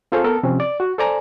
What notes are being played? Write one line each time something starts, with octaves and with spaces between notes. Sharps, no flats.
C4 F4 G#4 A4 C5 C#5
B3 A4 A#4
C3 F3 C4 C#4
D5
F#4
A4 C5 D5 G#5 A#5